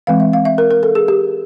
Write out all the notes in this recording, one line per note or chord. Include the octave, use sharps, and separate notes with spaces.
E3 G#3 C4 F5
E5
F5
E5
A#4
A#4
A4
G#4
G4